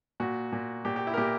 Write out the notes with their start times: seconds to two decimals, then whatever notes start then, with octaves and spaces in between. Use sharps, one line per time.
0.20 A#2 F#4
0.53 A#2
0.85 A#2 G4
0.96 G4
1.07 E4
1.14 A#4
1.17 A#2 G4